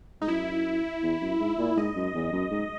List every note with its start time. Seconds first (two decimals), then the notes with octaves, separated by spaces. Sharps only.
0.22 G#2 D#4
0.28 F#2 E4
1.03 E2
1.21 F#2
1.39 G#2
1.58 A#2
1.76 G#2 D#5
1.96 F#2
2.14 E2
2.32 F#2
2.51 G#2